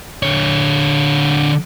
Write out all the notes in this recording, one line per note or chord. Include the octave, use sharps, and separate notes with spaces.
D3 C#5